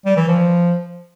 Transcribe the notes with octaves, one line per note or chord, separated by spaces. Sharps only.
G3
E3
F3